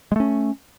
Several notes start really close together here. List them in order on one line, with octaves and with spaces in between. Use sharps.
G#3 A3 C#4